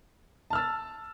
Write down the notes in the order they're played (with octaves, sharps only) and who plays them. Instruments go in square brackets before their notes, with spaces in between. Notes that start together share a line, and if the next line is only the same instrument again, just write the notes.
[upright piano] A5
F6
E6
A6